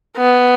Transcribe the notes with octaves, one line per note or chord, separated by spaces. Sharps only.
B3